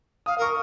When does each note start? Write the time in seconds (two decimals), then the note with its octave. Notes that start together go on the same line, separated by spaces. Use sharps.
0.26 F5 D#6
0.38 A#4 C#6